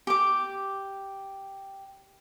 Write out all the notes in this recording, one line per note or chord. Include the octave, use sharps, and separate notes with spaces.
G4 D6